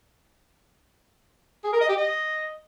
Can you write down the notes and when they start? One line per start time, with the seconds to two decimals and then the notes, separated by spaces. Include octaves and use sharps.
1.64 G#4
1.73 A#4
1.81 D#5
1.89 G4
1.97 D#5